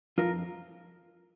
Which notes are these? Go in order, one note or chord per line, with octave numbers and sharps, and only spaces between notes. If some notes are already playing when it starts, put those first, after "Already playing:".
F2 F4 A#4